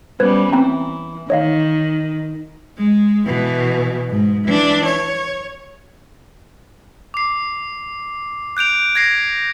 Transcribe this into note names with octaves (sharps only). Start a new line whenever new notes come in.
G3 B3 C#4 B4 C5 G#6
E3 C4 G5 A#5
D#3 C#5 D#5 F5
G#3
B2 E3
G#2
E3 D4
C#5
D6 C7
F#6 G6 D7 F7
G#6 A#6 C7